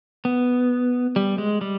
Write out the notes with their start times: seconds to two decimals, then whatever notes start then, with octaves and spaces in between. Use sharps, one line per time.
0.25 B3
1.16 G3
1.38 G#3
1.61 G3